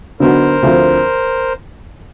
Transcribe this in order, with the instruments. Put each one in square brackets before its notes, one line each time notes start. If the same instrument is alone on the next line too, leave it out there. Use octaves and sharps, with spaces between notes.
[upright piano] D3 F#3 B3 D#4 F#4 [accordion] A#4 C5
[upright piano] D2 D3 F3 A3 C4